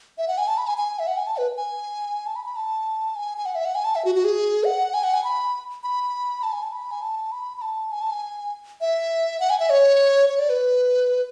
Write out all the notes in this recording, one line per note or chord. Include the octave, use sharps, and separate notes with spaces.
E5
F#5
G#5
A5
B5
G#5
G#5
E5
F#5
G#5
A5
B4
G#5
A5
B5
B5
A5
G#5
G#5
F#5
E5
F#5
G#5
A5
E5
F#4
F#4
G#4
F#5
G#5
F#5
G#5
B5
B5
A5
G#5
A5
B5
G#5
A5
B5
B5
A5
G#5
A5
G#5
E5
F#5
G#5
E5
C#5
C#5
D5
B4